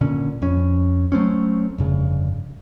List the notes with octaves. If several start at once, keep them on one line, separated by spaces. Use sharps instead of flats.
A#2 D3 C#4
F2 C#4
F#3 A3 C4 C#4
F1 G2 C#3